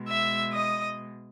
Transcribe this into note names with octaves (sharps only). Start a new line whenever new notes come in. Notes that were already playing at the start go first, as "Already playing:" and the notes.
Already playing: B2 G#3
E5 E6
D#5 D#6